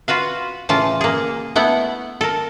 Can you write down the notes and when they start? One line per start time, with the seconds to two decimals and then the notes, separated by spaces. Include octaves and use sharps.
0.08 F4 F#4 B4 F5
0.69 A2 C#3 E3 F4 A5
1.01 A#3 G#4
1.56 A3 B3 E4 F#5
2.21 A4 A#4